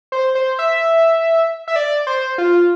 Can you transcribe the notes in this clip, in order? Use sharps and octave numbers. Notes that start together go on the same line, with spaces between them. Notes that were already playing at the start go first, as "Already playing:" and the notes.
C5
C5
E5
E5
D5
C5
F4